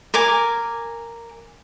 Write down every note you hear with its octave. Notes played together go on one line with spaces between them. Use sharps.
A#4 G#5 D6